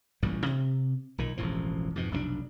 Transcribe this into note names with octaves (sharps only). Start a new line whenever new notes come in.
A1 G2 A#2 G3
C3
B1 A#2 D#3
E1 A1 A2 F3
F2 G#2 B2
F1 B1 B2 D4